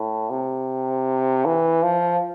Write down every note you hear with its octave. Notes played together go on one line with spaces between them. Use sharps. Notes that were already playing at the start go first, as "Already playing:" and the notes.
Already playing: A2
C3
E3
F3